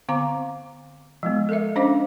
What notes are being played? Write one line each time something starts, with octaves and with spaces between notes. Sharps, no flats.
D3 B3 C4 F5 A#5 D6
F3 G#3 B3
A4 A#4 D#5 E5
C#4 D4 C5 D#5 F5 D6